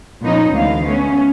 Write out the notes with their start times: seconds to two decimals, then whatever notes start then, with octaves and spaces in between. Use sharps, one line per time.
0.22 A#2 F3 B3 C#4 D#4
0.51 D2 E3 G#3 B3 F5
0.83 A3 B3 C#4